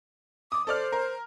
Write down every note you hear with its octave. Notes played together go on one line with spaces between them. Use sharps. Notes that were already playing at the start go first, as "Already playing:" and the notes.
D6 D#6
A4 C5 D5 F6
A#4